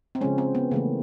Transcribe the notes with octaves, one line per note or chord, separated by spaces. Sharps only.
C4
C#3 F3 G#3 C#4
C4
B3
C#3 E3 A3 A#3